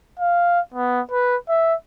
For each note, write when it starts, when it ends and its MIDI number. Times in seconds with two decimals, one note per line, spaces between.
0.19 0.60 77
0.74 1.01 59
1.11 1.36 71
1.49 1.74 76